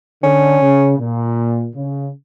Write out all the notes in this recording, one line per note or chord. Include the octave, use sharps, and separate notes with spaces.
D3 C#4
C#3
A#2
C#3